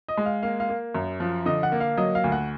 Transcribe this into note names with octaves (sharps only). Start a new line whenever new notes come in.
D#5
G#3
F5
A#3 F5
F5
A#3
F#2
F3
D3 D#5
F#5
A#3
F5
F#3 D#5
F5
D2
F#5